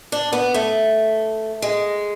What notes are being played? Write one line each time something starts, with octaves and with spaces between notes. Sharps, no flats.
D4
B3
A3
G#3